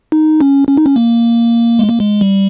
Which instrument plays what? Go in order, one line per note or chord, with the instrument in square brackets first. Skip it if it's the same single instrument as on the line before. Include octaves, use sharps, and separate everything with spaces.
[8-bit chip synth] D#4
C#4
C#4
D#4
C#4
A#3
G#3
A#3
G#3
G3